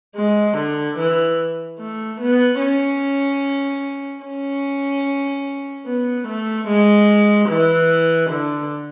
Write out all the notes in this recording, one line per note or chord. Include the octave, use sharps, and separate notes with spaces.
G#3
D3
E3
A3
B3
C#4
C#4
B3
A3
G#3
E3
D3